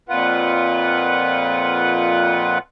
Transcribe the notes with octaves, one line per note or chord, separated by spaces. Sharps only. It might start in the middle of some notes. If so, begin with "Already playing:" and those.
F2 A#2 F4 B4 F#5